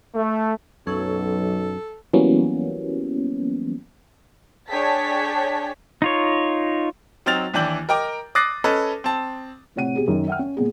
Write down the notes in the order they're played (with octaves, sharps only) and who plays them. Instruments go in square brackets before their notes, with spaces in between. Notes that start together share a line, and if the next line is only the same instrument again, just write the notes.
[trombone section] A3
[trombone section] B1 [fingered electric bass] F#2 [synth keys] F#3 [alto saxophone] A4
[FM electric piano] E3 F#3 G3 A#3 B3 C#4
[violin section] D4 G#4 C#5 G5 A5 B6
[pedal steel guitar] D#4 F4 C#5
[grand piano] F#3 C4 D#4 F6 A6 F7
D#2 E3 D4 G6 F#7
A#4 D#5 G5 A#5 D6
D6 D#6 F#6 A6 A#6 C7
C#4 A4 B4 D#5
C4 A5
[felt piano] A2 C3 C#5 F#5 D#7
B2 G4 G#4
F#2 D#3
E5 F#5 G5 F6
C#4
A#2 B3 G#4